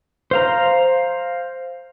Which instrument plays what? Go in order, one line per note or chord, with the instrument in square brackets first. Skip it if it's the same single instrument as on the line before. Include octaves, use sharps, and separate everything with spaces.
[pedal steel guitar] C5 F5 A#5